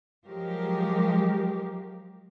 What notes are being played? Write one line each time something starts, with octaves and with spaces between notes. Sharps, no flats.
F3 F#3 G#3 G4 A#4